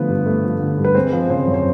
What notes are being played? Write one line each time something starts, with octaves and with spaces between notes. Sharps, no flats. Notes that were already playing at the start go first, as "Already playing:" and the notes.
Already playing: D3 F3 A3 B3 B4
G2
A3
F3
D3
G2
B4
G#3 C4 C5
F3
C#3 C4 C5
F#2
C5